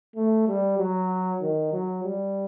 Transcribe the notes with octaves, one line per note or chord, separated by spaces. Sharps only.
A3
G3
F#3
D#3
F#3
G3